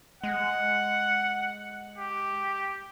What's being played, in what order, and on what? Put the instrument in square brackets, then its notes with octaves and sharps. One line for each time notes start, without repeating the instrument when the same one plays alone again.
[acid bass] G#3 [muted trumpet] F#5
[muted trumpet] G4